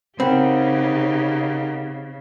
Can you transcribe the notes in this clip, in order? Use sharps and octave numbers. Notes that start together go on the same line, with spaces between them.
C#3 C4 D#4 G4 A#4 F#5 B5